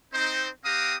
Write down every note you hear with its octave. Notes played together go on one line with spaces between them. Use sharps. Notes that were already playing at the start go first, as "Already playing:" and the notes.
C4 D#4 C5
C4 G4 F5 F#5 A#5 D#6